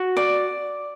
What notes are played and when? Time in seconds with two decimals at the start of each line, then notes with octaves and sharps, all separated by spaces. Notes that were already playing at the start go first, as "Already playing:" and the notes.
Already playing: F#4
0.17 D5